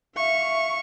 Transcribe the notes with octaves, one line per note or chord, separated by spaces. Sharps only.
E5 F5 C#6